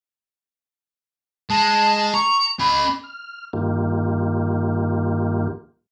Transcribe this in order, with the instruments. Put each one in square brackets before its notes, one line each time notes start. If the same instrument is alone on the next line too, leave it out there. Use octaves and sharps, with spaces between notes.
[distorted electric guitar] G#3 [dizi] A5
[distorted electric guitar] A#5 [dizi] C#6
[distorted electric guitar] C#4 D#5 [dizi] B5
[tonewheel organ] F6
G2 D#3 A#3 F4 G4